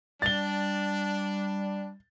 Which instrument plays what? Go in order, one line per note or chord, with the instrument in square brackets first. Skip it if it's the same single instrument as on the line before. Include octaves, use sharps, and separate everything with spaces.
[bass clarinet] G3 [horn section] D4 [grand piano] A6 G7